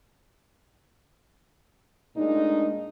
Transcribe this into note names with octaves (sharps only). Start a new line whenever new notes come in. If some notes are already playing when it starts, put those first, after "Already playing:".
A#2 G#3 A3 D4 D#4